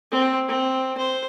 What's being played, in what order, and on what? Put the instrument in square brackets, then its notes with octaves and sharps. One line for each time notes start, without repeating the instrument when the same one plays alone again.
[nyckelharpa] C4
C4
C5